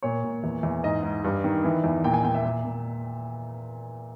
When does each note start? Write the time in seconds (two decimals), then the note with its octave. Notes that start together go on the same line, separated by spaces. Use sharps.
0.03 A#2 C#5
0.24 A#2
0.44 E2
0.63 E2
0.83 G#2 D#5
1.03 G#2
1.24 G2
1.44 D#3
1.64 E3
1.84 E2
2.04 A#2 G5
2.14 G#5
2.24 A#2 G5
2.35 E5
2.45 A#2
2.65 A#2